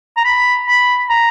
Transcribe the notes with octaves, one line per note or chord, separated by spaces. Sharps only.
A#5
B5
B5
A#5